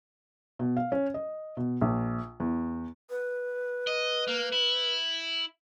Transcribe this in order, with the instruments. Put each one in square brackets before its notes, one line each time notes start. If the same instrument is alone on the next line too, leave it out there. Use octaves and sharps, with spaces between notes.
[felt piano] B2
F5
C#4
D#5
B2
A#1
E2
[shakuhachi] B4
[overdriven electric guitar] D#5
A#3
E4